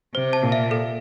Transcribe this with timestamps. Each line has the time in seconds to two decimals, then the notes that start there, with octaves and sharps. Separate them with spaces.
0.15 C3 C5
0.33 A5
0.42 A#2
0.52 E5
0.71 A4